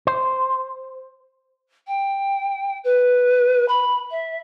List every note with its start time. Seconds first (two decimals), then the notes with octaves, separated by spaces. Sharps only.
0.07 C5
1.87 G5
2.84 B4
3.68 B5
4.10 E5